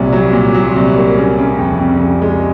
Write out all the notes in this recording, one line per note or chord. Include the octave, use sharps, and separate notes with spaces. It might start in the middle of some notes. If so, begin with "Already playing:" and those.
Already playing: C2 A#2 F#3
F#3
A#2
F#3
C2
A#3
C#3
C#3
F2
F2
C#3
G#3